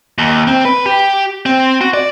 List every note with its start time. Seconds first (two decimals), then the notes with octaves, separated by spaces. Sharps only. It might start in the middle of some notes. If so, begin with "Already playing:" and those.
0.18 D#2
0.47 C4
0.65 B4
0.86 G4
1.46 C4
1.81 F#4
1.94 D5